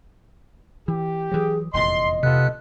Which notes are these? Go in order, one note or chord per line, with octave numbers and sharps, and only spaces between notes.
E3 G4
E3 F#3 G#4
F1 E2 A#2 D#5 C6
C3 B3 F4 A4 F#6